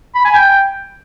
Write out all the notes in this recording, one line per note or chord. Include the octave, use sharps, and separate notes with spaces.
B5
G#5
G5